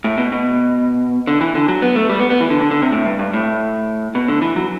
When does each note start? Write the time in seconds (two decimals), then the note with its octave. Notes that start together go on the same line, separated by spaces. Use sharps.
0.04 A2
0.18 B2
0.32 B2
1.27 D3
1.41 E3
1.55 D3
1.68 F#3
1.82 B3
1.96 A3
2.10 G3
2.19 B3
2.30 B3
2.40 E3
2.50 D3
2.61 D3
2.71 D3
2.82 C3
2.92 A2
3.06 G2
3.19 G2
3.33 A2
4.15 B2
4.28 D3
4.42 E3
4.56 F#3